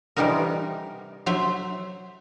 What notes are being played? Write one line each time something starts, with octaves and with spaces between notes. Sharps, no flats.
C3 E3 G3 D#4 F#4 A#4
F#3 C5 E5